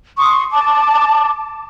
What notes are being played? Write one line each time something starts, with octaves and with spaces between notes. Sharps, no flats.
C6 C#6 D#6
A5 D6